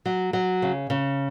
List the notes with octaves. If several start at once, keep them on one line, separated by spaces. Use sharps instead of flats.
F#3
F#3
C#3
C#3